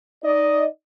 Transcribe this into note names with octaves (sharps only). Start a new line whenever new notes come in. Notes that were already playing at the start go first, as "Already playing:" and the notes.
D#4 D5 D#5